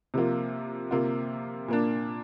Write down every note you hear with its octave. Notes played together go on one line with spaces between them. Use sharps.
C3 F3 A#3 F4
C3 A#3 F4
A#2 A#3 D4